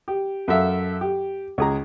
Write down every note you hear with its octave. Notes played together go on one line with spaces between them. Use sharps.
G4
F#2 A4 E5 F5
G4
C#2 G#4 A#5